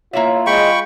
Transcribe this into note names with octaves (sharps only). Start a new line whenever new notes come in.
A#3 E4 F4 C#5 E5
G#3 G5 B5 C#6